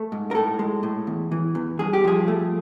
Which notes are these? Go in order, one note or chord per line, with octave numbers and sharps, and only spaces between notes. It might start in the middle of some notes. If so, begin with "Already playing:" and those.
Already playing: A3
G#2
A#4
A2 A4
G#3
A2
E2
E3
E2
G2 G#4
G4
F3 G#4
A3